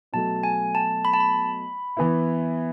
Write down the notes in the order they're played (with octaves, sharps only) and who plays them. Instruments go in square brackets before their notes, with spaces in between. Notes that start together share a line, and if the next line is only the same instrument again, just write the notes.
[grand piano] B2 F#3 A3 [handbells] A5
[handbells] G#5
A5
B5
A5
B5
[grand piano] E3 B3 E4